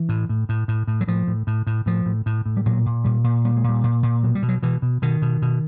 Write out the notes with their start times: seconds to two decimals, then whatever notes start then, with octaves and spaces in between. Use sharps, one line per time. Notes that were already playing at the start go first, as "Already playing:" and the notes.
Already playing: E3
0.09 A2
0.29 A2
0.49 A2
0.68 A2
0.87 A2
1.01 F#3
1.08 A2 F3
1.27 A2
1.47 A2
1.67 A2
1.86 A2 F3
2.06 A2
2.26 A2
2.46 A2
2.57 G3
2.66 A#2 F#3
2.86 A#2
3.04 A#2 G3
3.24 A#2
3.45 A#2 G3
3.57 G#3
3.64 A#2
3.69 G3
3.83 A#2
4.03 A#2
4.23 B2 F#3
4.35 G3
4.42 B2
4.48 F#3
4.63 B2 E3
4.82 B2
5.02 B2 D#3
5.22 B2
5.42 B2